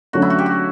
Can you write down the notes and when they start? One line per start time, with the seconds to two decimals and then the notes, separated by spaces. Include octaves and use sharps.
0.13 D3 F#3 A3 C#4 F#4
0.22 E4
0.30 F#4
0.39 G4
0.46 F#4